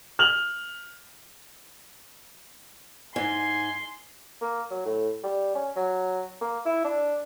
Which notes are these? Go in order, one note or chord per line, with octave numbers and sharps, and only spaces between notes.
F6 F7 F#7
G#2 G#5 C6
A#3
F#3
A2
G3
C#4
F#3
A#3
E4
D4